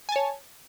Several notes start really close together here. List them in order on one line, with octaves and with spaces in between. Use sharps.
G#5 A5 C#5